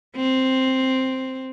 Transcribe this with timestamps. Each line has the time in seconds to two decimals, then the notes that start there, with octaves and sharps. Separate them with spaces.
0.16 C4